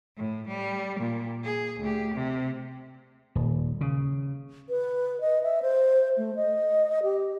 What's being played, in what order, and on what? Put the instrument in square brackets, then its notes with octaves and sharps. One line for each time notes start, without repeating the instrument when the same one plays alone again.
[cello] A2
G3
A#2
G#4
D2 G4
C3
[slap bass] D#1
C#3
[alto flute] B4
D#5
E5
C5
A3
D#5
G4